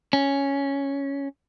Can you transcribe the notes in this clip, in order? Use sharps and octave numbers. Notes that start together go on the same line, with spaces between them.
C#4